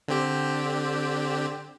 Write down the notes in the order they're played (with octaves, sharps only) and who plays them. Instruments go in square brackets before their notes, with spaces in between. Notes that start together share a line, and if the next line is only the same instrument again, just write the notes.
[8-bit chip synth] D3 C4 G4